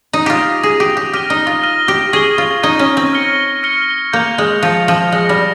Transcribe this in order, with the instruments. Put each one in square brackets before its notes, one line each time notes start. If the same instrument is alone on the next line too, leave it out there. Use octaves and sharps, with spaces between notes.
[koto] D#4 [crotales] D#6 A#6 D#7
[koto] F4 G4
[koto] G#4 [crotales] D#6 A#6 D#7
[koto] G4
G4
[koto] G4 [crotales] F6 A#6 D#7 G7
[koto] D#4
F4
[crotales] F6 A#6 D#7 G7
[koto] G4
[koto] G#4 [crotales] C#6 G#6 D#7 G7
[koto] F4
[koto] D#4 [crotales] C#6 G#6 D#7 G7
[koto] C#4
C4
[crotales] F6 A#6 C#7 G7
F6 A#6 C#7 G7
[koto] A#3 [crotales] G6 C#7 F7
[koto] G#3
[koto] F3 [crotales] G6 C#7 F7
[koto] F3
[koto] G#3 [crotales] F6 A#6 C#7
[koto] G3